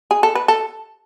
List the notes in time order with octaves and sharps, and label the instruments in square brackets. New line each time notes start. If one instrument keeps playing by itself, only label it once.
[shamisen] G#4
A4
B4
A4